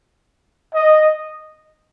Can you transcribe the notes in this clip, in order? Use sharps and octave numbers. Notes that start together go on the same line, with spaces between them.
D#5